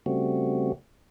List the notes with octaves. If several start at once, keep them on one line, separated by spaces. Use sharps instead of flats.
C#3 G3 A3 C4 F#4